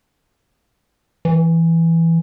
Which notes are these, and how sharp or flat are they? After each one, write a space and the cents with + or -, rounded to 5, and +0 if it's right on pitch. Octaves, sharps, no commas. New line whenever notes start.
E3 +5